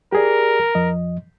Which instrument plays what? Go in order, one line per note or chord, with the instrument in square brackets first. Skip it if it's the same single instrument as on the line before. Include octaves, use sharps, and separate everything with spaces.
[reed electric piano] G4 G#4 D5 [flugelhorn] A#4
[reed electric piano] F2 F3 D#5